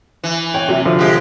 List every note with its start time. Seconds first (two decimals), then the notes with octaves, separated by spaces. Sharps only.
0.24 E3
0.54 C#5 G5
0.68 C3 F#3
0.85 D3 F3
0.99 G#3 G4